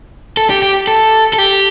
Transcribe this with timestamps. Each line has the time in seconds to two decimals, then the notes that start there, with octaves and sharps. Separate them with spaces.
0.37 A4
0.50 G4
0.62 G4
0.87 A4
1.33 A4
1.38 G4